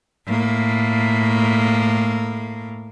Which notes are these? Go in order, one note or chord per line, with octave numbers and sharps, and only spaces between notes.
A2 A#3